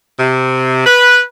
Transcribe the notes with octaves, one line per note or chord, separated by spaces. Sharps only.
C3
B4